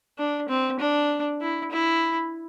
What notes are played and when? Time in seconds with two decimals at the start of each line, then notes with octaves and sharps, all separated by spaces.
0.18 D4
0.49 C4
0.80 D4
1.41 E4
1.72 E4